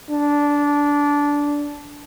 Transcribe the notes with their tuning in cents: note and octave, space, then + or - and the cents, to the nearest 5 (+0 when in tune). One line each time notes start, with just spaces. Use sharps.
D4 -15